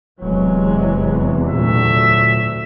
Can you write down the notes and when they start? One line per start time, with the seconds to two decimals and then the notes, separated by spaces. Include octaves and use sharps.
0.21 D1 E2 C3 E3 F#3 G#3
1.49 D2 A#2 F#3 E5